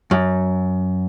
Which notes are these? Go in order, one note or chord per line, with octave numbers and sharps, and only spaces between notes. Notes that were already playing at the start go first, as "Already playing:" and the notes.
F#2